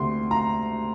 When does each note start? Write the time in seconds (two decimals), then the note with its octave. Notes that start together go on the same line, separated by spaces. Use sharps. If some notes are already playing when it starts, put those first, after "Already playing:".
Already playing: D2 C3 C6
0.31 A#5